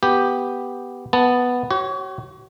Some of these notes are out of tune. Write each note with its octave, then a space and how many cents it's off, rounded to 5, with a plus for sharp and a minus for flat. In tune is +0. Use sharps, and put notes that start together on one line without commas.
B3 +0 G4 +0
B3 +0 A5 +0
F#4 +45 C#5 -15